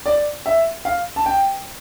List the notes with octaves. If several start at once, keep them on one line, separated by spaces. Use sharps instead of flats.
D5
E5
F5
A5
G5